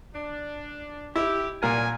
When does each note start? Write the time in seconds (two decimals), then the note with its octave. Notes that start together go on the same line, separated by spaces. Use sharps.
0.15 D4
1.16 E4 G4
1.63 A#2 F#3 D4 A#4 G#5